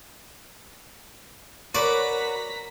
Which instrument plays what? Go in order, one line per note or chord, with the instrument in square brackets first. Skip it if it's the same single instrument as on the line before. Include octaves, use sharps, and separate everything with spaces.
[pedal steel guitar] F#4 B4 [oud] A#4 C#5 [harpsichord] D5 [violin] A#5 B6